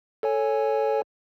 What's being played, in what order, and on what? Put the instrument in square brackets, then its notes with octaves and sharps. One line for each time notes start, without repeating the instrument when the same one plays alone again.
[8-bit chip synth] A4 C#5 G#5